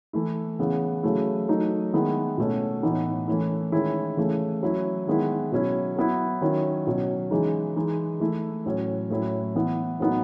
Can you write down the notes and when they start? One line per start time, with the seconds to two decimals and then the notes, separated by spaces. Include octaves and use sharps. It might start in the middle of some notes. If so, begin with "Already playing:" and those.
0.13 E3 A3 E4
0.59 C#3 E3 B3
1.03 C#3 F#3 A3 E4
1.49 F#3 A3 D#4
1.93 D#3 G#3 B3 E4
2.38 B2 A3 C#4
2.83 A2 E3 B3 D#4
3.28 E3 A3 C#4 E4
3.72 D#3 G#3 C#4 E4
4.17 C#3 E3 A3
4.63 F#3 C#4 E4
5.07 D#3 G#3 B3 E4
5.52 B2 F#3 C#4 E4
5.97 F#3 B3 E4
6.41 D#3 F#3 C#4 E4
6.87 B2 F#3 C#4
7.31 C#3 E3 G#3 D#4
7.76 E3 G#3 D#4
8.20 E3 A3 E4
8.66 A2 F#3 C#4
9.10 A2 F#3 C#4 E4
9.55 E3 B3 E4
10.00 A2 F#3 B3 D#4